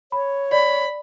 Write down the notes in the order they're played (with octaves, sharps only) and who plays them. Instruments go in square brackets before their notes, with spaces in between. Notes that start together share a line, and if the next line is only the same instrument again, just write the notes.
[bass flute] C#5 [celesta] B5
[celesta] D5 [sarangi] B5